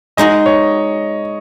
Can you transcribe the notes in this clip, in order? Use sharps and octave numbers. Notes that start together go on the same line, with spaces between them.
G#3 D#4 F#4 D#5
C#5